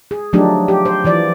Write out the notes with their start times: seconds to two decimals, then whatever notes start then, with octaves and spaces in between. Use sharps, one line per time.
0.11 G#4
0.33 F3 F#3 A3 D4 D#4 G4
0.68 G4
0.85 C5
1.04 E3 F3 D5